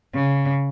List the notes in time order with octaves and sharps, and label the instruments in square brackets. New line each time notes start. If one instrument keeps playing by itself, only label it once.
[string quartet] C#3